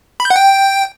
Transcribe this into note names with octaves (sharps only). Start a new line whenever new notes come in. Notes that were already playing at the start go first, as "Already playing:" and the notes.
B5
G6
F#5
G5